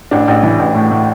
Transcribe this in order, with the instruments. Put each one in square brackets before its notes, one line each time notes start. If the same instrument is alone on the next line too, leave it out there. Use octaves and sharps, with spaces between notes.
[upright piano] A1 D4
A1
E3
A1
A2
A2